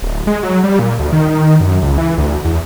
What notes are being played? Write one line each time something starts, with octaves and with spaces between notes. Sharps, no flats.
D1
G#3
F#3
G3
A#2
D2
D#3
F#2
C#2
E3
D2
E2